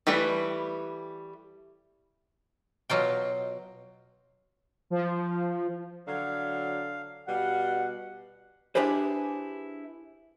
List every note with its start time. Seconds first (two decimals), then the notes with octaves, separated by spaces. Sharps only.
0.07 E3 G3 A3 B4
2.90 B2 F#3 F4 G5
4.90 F3
6.07 D3 F#3 F5
7.28 B2 G3 F5 F#5
8.75 D4 E4 G4 G#4 B4 C5